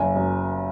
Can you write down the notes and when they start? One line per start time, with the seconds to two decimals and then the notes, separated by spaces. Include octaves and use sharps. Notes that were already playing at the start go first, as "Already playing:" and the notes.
Already playing: F#1 G#5
0.15 F#2